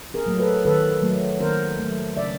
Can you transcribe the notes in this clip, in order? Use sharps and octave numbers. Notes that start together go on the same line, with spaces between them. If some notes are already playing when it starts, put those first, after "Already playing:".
G#4 A#4
F#3 A3
A4 B4
D#3 A4 B4
F#3 A3
D#3 A#4 C5
F#3 A3
C#3 D5 E5